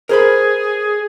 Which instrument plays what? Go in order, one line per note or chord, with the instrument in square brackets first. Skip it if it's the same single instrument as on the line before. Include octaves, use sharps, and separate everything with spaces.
[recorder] G#4 [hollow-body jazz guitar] A#4 C5 B5